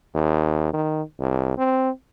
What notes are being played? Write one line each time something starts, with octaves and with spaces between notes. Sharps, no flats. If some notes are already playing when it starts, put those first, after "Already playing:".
D#2
D#3
C2
C4